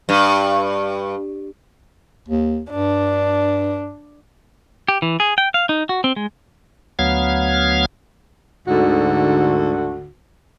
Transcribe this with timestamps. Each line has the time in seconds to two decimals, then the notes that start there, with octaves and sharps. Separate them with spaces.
0.09 G2
2.28 D#2
2.71 G2 D4
4.88 G4
5.02 E3
5.20 G#4
5.38 G5
5.54 F5
5.69 D#4
5.89 F#4
6.04 C4
6.16 G#3
6.99 D2 F#3 B3 F5 F6 G#6
8.68 D2 G#2 D3 F#4